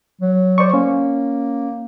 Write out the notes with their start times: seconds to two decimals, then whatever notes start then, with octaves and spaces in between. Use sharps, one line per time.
0.21 F#3
0.58 C5 D5 C#6
0.74 A#3 C#4